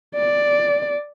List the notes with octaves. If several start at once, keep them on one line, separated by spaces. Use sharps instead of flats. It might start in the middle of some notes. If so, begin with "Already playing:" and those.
D5